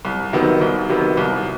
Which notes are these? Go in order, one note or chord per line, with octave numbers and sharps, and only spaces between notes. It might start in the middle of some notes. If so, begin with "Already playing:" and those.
C2
C3 D#3 F#3 B3
C2
C3 D#3 F#3 B3
C2